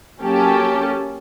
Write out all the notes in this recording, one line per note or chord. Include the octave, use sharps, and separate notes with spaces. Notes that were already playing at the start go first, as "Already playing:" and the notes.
F#3 A#3 C#4 G4 A4